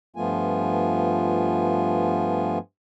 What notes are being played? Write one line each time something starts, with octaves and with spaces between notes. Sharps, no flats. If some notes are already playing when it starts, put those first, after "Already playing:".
G2 F3 A3 B3 F4 G#5